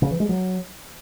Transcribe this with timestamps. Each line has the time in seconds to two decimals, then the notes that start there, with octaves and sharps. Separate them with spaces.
0.02 C#3
0.11 E3
0.20 G#3
0.29 F#3